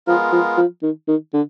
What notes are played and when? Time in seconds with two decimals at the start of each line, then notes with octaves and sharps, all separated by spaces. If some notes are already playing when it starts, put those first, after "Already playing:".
0.07 F3 G#3 B3 F4 A#4
0.32 F3
0.57 F3
0.83 D#3
1.08 D#3
1.34 D3